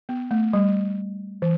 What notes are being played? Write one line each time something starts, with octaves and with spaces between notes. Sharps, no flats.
B3
A3
G3
E3